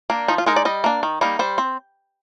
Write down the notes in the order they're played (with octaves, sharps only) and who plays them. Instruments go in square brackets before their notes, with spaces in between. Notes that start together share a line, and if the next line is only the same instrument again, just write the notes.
[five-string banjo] A#3 D4
F3 D#4
F4
G#3 D#4 A#4
D5
G3 D#5
A#3 D4
D#3
G3 A#3 D#4
G3 C5
C4